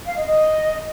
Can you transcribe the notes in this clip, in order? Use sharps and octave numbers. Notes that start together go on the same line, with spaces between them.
F5
D#5
D#5